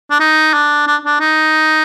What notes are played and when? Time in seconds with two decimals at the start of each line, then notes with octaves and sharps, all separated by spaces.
0.11 D4
0.20 D#4
0.53 D4
0.87 D4
1.05 D4
1.20 D#4